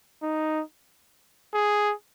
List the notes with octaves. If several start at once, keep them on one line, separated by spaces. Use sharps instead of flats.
D#4
G#4